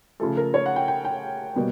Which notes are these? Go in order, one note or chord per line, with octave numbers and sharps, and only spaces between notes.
C#3 F3 A3 A4
A#4
C#5
F#5
G5
G5
G5
B2 G3 A#3